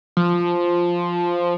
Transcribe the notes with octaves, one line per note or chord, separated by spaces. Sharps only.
F3